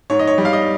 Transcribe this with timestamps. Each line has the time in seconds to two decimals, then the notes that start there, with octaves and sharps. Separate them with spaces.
0.10 G#2 C#5
0.19 D#5
0.27 C#5
0.38 G3
0.45 F5
0.53 D#5